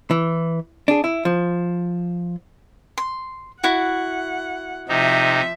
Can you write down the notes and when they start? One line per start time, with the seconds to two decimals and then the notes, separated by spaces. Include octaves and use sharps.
0.11 E3
0.88 D4 G#4
1.04 E4
1.25 F3
2.98 C6
3.64 E4 F#4 F#5
4.89 C3 F3 D#4 E5